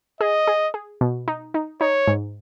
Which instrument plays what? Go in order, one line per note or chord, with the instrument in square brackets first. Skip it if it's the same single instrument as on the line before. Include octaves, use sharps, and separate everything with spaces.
[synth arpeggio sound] G#4 [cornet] D#5
[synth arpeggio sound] G#4
G#4
B2
D#4
D#4
[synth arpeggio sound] D#4 [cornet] C#5
[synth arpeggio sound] G#2